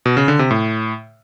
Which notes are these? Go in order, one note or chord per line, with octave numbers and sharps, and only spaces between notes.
B2
C#3
D3
C3
A2